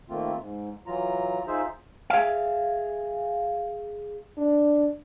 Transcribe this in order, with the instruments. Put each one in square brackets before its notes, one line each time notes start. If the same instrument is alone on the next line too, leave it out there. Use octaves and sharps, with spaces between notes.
[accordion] D#3 A3 A#3 C4 F4
G#2
E3 F#3 F4 A#5
D#4 F4 G#4 C5 E5
[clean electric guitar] G#4 E5 F5
[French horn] D4